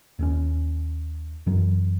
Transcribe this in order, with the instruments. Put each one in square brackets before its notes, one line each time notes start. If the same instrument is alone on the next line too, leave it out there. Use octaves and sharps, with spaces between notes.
[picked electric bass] D#2 C4 C#4
F#2 E3 F#3